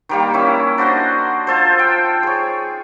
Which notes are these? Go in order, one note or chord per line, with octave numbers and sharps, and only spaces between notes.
D#3 G3 A#3
C#4 E4
D4 F#4 C5 D#5
F4 A4 C5
G5
G#4 C#5